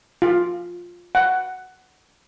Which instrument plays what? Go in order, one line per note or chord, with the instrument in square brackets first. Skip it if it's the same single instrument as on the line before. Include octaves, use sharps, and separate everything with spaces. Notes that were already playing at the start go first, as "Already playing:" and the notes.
[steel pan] F4
F#5